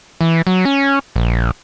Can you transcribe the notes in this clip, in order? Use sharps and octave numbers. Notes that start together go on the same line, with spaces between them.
E3
F#3
C#4
A#1